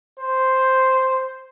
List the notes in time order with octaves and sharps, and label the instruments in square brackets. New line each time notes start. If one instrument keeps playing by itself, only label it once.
[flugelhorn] C5